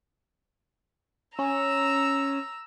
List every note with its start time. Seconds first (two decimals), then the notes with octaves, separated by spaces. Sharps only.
1.39 C#4 A#5 E6